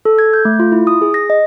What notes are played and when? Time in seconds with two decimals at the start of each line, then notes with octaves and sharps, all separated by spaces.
0.05 A4
0.19 G#6
0.33 G6
0.45 A3
0.59 F4
0.72 E4
0.87 D#6
1.02 G#4
1.14 A#6
1.30 D#5